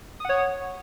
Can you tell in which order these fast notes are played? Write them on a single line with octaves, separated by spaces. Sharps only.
D#6 F#5 C#5